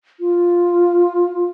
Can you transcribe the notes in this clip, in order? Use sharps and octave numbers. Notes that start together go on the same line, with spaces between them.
F4